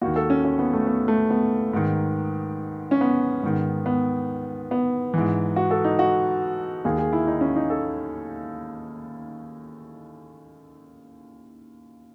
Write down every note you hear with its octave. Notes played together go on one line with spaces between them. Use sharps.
D#2 D#3 F#4
A4
C#4
C#4
B3
A3
B3
A3
B3
G#2 D#3
C#4
B3
G#2 D#3
B3
B3
G#2 E3
F#4
A4
D#4
F#4
D#2 D#3 G#4
G#4
E4
D#4
C#4
D#4
A4